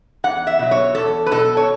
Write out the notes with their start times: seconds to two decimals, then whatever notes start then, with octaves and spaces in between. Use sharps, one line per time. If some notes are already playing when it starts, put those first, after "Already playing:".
0.24 E2 F#5
0.47 E5
0.59 B2 F#3
0.71 C#5
0.95 E2 A4
1.26 B4
1.31 B2 F#3 A4
1.57 C#5